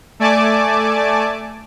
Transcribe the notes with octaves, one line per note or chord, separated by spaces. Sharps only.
A3 D5 G#5 A5 D6